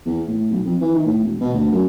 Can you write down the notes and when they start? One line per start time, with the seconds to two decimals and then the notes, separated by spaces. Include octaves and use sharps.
0.06 E2
0.27 A2
0.51 B1
0.65 F2
0.81 E3
0.95 D#3
1.06 A2
1.23 E1
1.41 B2
1.54 D2
1.72 F#2